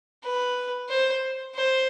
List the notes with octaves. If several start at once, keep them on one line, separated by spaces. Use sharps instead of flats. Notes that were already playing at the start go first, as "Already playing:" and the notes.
B4
C5
C5